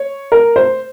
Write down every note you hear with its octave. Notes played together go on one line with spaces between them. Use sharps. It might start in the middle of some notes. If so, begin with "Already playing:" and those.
Already playing: C#5
A#4
C5